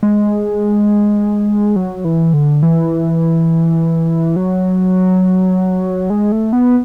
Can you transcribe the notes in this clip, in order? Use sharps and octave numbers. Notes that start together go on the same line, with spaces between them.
G#3
F#3
E3
D3
E3
F#3
G#3
A3
B3